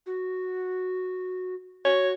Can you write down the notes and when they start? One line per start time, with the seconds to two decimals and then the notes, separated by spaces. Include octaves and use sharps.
0.06 F#4
1.85 F#4 C#5